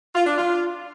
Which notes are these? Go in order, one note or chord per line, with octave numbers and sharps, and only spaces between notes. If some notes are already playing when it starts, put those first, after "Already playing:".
F4
D4
F4